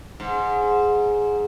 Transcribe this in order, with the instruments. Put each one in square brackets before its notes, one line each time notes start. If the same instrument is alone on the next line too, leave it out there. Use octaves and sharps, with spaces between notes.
[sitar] G#2